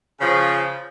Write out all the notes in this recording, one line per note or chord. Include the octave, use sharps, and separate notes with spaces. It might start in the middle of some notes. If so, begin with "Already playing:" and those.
C#3 F3